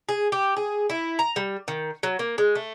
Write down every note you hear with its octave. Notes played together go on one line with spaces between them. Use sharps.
G#4
G4
G#4
E4
A#5
G3
D#3
F#3
A#3
G#3
A3